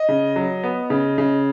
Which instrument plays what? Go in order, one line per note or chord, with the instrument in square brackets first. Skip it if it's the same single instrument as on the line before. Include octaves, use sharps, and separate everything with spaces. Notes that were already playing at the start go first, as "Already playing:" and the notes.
Already playing: [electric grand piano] D#5
[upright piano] C#3
F#3
B3
C#3
C#3